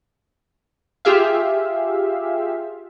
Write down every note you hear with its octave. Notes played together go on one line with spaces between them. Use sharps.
F4 G4 G#4 E5 F5